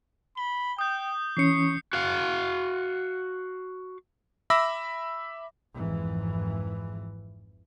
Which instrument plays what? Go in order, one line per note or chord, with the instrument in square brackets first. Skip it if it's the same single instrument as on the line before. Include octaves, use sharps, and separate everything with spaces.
[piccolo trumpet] B5 [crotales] G7
[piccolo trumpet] G5 [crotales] D#6 G6
[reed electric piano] E3 C#4 [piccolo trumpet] C#6 [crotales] C7 C#7
[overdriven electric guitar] F#4 F5
[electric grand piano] E5 B5 D6 E6 A#6
[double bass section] G#1 F2 G#2 E3